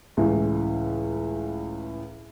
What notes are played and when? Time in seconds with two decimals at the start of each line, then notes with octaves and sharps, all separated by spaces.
0.17 C#2 A2 E3